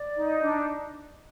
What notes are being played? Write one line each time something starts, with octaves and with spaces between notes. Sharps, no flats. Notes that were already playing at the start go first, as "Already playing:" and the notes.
Already playing: D5
D#4
D4